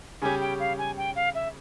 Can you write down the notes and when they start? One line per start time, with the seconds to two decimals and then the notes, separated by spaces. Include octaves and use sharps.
0.22 C#3 G3 C#4 G4 G#5
0.40 G5
0.60 F5
0.78 G#5
0.97 G5
1.16 F5
1.35 E5